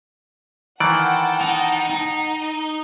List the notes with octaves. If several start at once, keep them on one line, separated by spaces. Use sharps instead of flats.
D#3 E3 D5 F#5 G5 A5
D#4
D#4